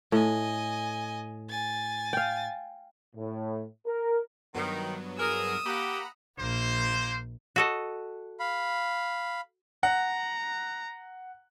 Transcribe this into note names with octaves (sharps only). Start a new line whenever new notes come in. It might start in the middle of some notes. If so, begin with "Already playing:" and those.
A2 D#5 G#5
G#5 A6
F5 G5
A2
A#4
G2 D#3 F#3 B3
G#4 A#4 D#6 E6
A#3 G4 F#5 A#5 B5
A#1 A#3 C5
F#4 A4 D#5
F5 B5
F#5 A#5